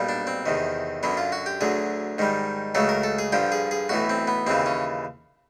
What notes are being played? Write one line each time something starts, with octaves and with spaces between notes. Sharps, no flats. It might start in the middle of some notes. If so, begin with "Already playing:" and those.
Already playing: B1 A#2 G3
D4
C4
E2 C3 D#3
F#2 D3 F#3 B3
F4
F#4
G4
D2 D3 F#3 G#4
G#2 D#3 G3
C#2 C#3 F#3 A3 A4
A#4
A4
G#4
G2 D3 F3 G4
G#4
G#4
B1 A2 E3 F#4
C4
B3
D#2 C#3 E3 C4
C#4